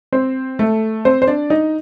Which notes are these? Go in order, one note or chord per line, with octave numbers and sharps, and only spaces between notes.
C4 C5
A3 A4
C4 C5
C5
D4 D5
D#4 D#5